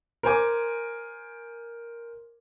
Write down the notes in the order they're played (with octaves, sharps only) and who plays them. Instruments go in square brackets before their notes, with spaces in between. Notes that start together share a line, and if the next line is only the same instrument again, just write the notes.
[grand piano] A#4 C5 G#5 D6